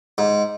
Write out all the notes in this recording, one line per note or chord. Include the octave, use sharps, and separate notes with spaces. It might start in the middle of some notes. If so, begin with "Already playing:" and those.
G#2